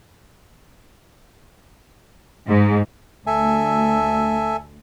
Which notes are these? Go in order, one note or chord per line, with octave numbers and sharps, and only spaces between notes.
G#2
D2 A4 E5 G#5